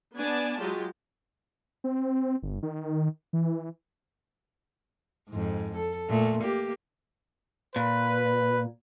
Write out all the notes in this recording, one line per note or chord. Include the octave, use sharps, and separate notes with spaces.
B3 D4 D5 G#5 A5
F#3 G#3 F4 G4
C4
G1
D#3
E3
F2 G#2
A4
A#2 A3
A#3 G4
A#2 B4